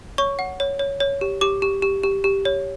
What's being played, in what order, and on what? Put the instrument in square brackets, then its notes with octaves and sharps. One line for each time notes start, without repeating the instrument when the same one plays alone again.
[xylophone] C#5 C#6
F#5
C#5
C#5
C#5
G4
G4 D6
G4
G4
G4
G4
C#5